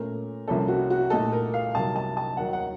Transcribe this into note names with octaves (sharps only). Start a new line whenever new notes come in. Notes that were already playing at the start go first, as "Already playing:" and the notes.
Already playing: A#2 A3 C#4 A#4
C2 C3 F3 A#3 C#4 A4
F#4
F#4
A#2 A3 D#4 A4
A#4
F5
C2 C3 D#3 F#3 A5
A5
A5
D#2 D#3 F#3 F#5
F#5